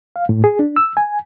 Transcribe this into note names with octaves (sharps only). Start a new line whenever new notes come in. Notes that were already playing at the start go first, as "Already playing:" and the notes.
F5
A2
G#4
D4
E6
G#5